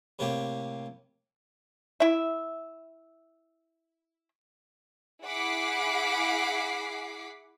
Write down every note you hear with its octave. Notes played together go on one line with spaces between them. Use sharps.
A2 C3 A#3 G4
E4 E5
E4 G#4 F#5 D6 B6 C7